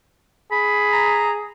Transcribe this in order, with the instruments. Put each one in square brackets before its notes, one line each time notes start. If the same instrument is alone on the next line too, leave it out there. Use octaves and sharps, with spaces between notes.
[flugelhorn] G#4 [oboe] B5
[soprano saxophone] A#5